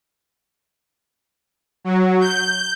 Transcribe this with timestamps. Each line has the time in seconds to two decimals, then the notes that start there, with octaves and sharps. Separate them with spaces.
1.84 F#3
2.21 G6